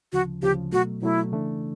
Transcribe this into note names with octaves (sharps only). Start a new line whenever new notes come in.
D2 C#3 F3 F#4
D2 C#3 F3 G4
B2 F#3 A3 F#4
B2 F#3 A3 E4
C#3 E3 A3 D4